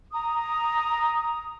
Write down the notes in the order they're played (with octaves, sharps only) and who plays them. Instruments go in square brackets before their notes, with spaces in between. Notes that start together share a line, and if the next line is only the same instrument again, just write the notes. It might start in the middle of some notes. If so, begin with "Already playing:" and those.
[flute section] A#5 D#6